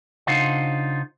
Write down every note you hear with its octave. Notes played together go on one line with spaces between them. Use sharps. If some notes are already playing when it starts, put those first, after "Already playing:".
C#3 D4 D#4 F4 C5 F#5